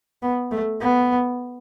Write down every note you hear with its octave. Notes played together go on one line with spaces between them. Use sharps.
B3
A3
B3